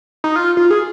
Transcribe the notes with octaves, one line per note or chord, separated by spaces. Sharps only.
D#4
F4
F4
G#4